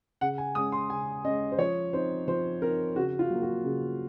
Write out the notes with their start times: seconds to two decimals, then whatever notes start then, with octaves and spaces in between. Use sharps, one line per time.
0.21 C#3 F#5
0.38 G#5
0.55 G#3 C#4 D#6
0.72 C6
0.90 C#3 G#5
1.24 G#3 C#4 D#5
1.52 C5
1.58 F3 C#5
1.93 C4 D#4 C5
2.28 F3 C5
2.62 C4 D#4 A#4
2.96 C#3 F#4
3.19 F4
3.30 F#3 A#3
3.42 F#4
3.64 C#3